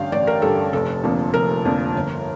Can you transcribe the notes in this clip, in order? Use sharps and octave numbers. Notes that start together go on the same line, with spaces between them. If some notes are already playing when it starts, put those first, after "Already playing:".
Already playing: A1 G2 D3 F5 G5
A1 D5
A#4
G2 D3 A4
F1 A4
F2 D3 F3 A#3
F1 A#4
F2 D3 F3 A#3
G1